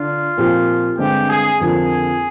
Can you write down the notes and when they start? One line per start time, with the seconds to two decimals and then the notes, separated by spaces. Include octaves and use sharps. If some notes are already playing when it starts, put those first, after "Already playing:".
Already playing: D3 D4 F4
0.37 A#2 F3 C4 G4
0.98 G2 D3 G#3 C4 G4
1.29 G#4
1.60 F2 D3 F3 A#3 F4 G#4